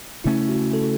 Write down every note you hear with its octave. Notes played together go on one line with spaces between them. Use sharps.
C#3 A3 C#4 E4
F#4
A4